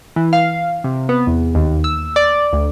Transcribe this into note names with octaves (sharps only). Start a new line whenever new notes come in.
E3
F5
C3
B3
E2
D#2
E6
D5
D2